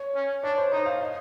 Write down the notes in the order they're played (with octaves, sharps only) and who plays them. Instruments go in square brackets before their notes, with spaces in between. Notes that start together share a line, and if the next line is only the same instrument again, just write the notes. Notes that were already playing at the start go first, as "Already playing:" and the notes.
Already playing: [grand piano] C#5
[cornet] C#4
[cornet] D4 [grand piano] C#5
[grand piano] C5
[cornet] D#4 [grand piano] C5
[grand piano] F5
D#5